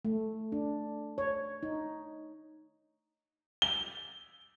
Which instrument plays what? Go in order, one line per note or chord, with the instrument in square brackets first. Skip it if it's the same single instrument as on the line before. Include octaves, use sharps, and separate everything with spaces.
[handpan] A3
D4
C#5
D#4
[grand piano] G7